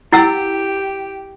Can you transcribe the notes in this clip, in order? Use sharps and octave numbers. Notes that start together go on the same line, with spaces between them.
E4 G4 F#5 E6